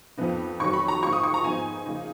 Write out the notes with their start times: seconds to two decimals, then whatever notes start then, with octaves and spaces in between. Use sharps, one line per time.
0.18 F2 F3 B3 D#4
0.60 F2 D#3 F#3 C#6
0.73 B5
0.88 A#5
1.03 G#2 F3 A#3 D#4 C#6
1.13 D#6
1.23 C#6
1.34 A#5
1.44 G#2 F3 B3 D#4 G#5
1.86 C#3 F3 A#3 D#4